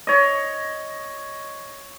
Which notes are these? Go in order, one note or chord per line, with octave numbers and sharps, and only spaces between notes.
C#5 D#5